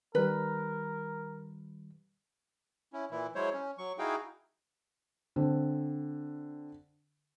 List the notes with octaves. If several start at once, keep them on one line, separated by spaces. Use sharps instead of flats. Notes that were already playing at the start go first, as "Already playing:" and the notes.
D#3 G3 A#4 B4
C#4 E4
A#2 E3 E4
F#3 G#3 E4 C5 C#5
C#4
F#3 C#6
D#4 E4 F#4 G#4 F5 G5
D3 C4